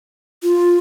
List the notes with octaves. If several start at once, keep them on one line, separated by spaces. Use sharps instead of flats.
F4